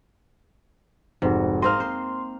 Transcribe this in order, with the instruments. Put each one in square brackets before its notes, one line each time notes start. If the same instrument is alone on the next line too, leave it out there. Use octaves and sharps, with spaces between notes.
[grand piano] F1 F#4 [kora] G#2
[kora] A#3 C4 D#5 [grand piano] C6 F6
[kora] C5